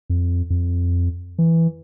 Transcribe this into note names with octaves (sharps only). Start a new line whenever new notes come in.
F2
F2
E3